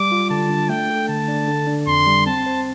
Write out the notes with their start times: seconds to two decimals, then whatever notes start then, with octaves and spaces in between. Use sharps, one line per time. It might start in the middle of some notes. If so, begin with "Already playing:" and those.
Already playing: G3 D6
0.12 F4
0.30 D3 A5
0.50 D4
0.69 A3 G5
0.90 A4
1.09 D3 A5
1.28 D4
1.48 D3
1.67 D4
1.87 F2 C6
2.07 G3
2.26 C4 A5
2.46 C5